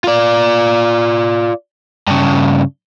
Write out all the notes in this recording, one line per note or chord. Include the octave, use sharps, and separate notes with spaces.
F4 D5
G2 C#3